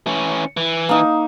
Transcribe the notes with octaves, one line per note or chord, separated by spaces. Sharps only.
E3 C#4
E3
A#3 D#4